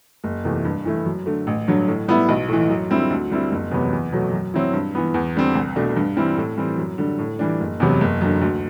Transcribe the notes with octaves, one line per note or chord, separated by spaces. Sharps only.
F#1
E2 C3 E3 A3
G2
E3 A3 E4
F#2
D3 A3
A1
G2 D3 F#3
A2
G3 B3 E4
B1
A2 E3
F#2
D3 G3 C4 E4
D2
D3 G3 C4 E4
F#1
E2 C3 F#3 B3
E2
B2 F#3 A3
F#2
F#3 C4 E4
G2
E3 B3
E2
D3 G3 C4
C2
B2 A3 D4
G2
E3 G3 C4 E4
A2
E3 G3 C4
F#2
D3 G3
A2
E3 G3 D4
F#1
E2 C3 F#3 B3
F#1
F#2 D3
D2